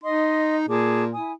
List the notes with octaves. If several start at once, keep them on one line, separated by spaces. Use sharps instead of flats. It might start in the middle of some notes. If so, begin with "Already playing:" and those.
D#4 D#5 C6 D#6
A#2 G#4 A5 D6
E4 G#5 D#6